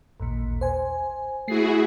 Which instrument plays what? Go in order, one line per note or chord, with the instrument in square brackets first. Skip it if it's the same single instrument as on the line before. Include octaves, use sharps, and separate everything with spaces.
[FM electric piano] A1 D#2 A#2
C5 G#5
[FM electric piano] A3 C7 [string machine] E4 F#4 G#4